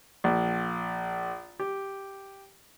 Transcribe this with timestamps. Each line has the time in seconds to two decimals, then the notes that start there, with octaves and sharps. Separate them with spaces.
0.24 A#1
1.60 G4